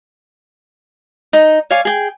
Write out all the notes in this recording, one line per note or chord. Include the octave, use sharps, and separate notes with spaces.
D#4
C#5 D5 F5 G#5
G#4 G5